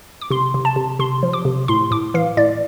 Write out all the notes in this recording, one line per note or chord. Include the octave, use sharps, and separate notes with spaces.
D6
C3 C6
C3
A5
C3
C3 C6
F3
D6
C3
A2 C6
A2 D6
E3 F5
A2 D5